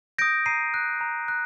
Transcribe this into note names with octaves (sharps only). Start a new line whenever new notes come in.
D#6 G6 A#6 D7
A#5 C7 D#7
F#6
A#5
F#6